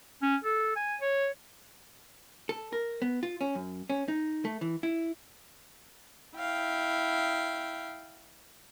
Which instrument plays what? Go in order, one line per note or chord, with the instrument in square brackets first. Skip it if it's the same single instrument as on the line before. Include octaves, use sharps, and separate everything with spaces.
[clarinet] C#4
A4
G#5
C#5
[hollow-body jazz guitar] A4
A#4
B3
F4
C#4
F#2
C#4
D#4
A3
E3
E4
[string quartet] E4 F5 G5